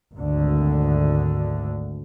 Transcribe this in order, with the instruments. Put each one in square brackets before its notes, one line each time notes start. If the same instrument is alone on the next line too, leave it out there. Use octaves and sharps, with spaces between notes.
[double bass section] G#1 D2 D3